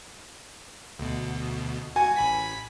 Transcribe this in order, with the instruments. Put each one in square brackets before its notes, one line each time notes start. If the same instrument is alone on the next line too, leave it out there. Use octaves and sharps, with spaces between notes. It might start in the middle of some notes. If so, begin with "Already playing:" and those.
[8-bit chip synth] D2 B2
[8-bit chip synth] F#4 [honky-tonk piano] G#5
[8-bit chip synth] A1 B5 B6